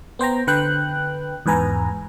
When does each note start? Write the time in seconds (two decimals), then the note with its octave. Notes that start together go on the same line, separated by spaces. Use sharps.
0.19 B3 C5 G5 A#5
0.47 D3 B4 G5 F#6
1.46 E2 G#2 B4 G#5 A#5